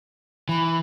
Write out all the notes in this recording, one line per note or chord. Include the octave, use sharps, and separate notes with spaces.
E3 B5